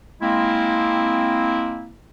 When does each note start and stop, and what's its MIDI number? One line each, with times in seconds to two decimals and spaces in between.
0.21 1.90 56
0.21 1.90 58
0.21 1.90 60
0.21 1.90 64